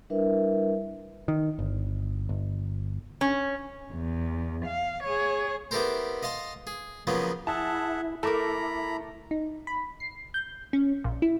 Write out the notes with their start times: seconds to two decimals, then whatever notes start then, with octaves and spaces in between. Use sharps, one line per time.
0.10 G3 D4 E4 A#4 B4 E5
1.28 D#3
1.59 G1
2.29 G1
3.21 C#4
3.93 E2
4.65 F5
5.04 G#4 C#5
5.71 B3 E4 G4 A4 A#4 C5
6.23 D#5 F5 A5 C6
6.67 G#4
7.07 C#3 F3 F#3 A#3 B3 C#4
7.47 E4 G#4 E5 F#5 A5
8.23 A3 E4 A4 A#4 A#5 B5 D6
9.31 D#4
9.67 B5
10.00 C7
10.34 G6
10.73 C#4
11.04 A#1
11.22 E4